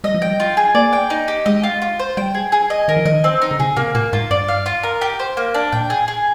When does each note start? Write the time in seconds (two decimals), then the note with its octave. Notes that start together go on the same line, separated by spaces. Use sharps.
0.04 G3 D#5
0.14 F3
0.22 G3 G5
0.40 F4
0.57 G#4
0.75 A#3 D5
0.93 G5
1.10 D#4
1.28 G4
1.46 G#3 D#5
1.63 F4
1.82 F4
1.99 C5
2.17 G3 G5
2.35 G#4
2.52 G#4
2.70 D#5
2.88 D#3 A#4
2.96 F3
3.05 D#3 D#5
3.24 C4
3.42 D#4
3.51 D3
3.59 C3 G#4
3.77 C3 A#3
3.95 A#2 A#3
4.13 G#2 F4
4.30 G2 D5
4.48 F5
4.66 F4
4.83 A#4
5.01 G4
5.19 C5
5.37 A#3
5.54 D4
5.72 A#2 G5
5.90 G#4
6.08 G#4